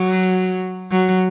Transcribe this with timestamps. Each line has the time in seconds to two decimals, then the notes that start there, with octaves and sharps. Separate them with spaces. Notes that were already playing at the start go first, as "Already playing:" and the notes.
Already playing: F#3
0.91 F#3